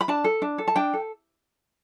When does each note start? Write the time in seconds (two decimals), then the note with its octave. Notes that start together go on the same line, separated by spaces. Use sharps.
0.01 B5
0.08 D4 A5
0.24 A4
0.42 D4
0.58 A4
0.68 A5
0.76 D4 G5
0.93 A4